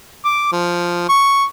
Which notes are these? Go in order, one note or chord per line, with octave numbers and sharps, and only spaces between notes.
D6
F3
C#6